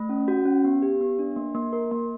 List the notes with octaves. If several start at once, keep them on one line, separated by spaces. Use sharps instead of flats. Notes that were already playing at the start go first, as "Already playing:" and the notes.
Already playing: A3
C#4
F#4
C#4
B3
G4
B3
D4
A#3
A#3
A#4
A#3